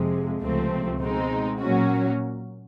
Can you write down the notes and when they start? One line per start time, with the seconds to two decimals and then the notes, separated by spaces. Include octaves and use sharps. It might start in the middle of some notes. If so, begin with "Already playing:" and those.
Already playing: F2 C3 F3 G#3
0.41 C#2 C3 F3 A3 C4
1.01 B2 G#3 C4 D#4
1.59 A#2 F#3 A#3 C#4 F#4